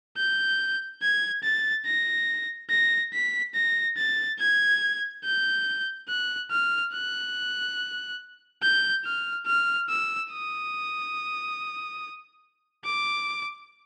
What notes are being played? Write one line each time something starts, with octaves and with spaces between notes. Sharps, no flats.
G6
G#6
A6
A#6
A#6
B6
A#6
A6
G#6
G6
F#6
F6
F#6
G6
F6
F6
E6
D#6
D6